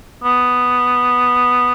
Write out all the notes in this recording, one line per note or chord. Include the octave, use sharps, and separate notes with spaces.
B3